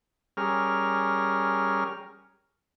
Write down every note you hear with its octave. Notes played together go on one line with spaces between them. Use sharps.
G3 C#4 G#4 A#4 F6